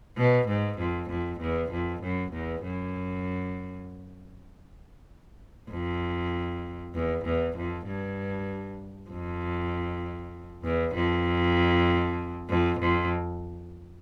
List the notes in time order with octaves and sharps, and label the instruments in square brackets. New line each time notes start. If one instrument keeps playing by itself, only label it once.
[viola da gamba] B2
G#2
F2
F2
E2
F2
F#2
E2
F#2
F2
E2
E2
F2
G2
F2
E2
F2
F2
F2